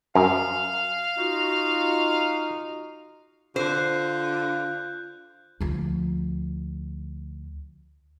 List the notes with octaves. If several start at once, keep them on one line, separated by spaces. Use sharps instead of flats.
F#2 F5
D#4 F4 F#4
D3 F4 C5 F#6 G6
D2 F3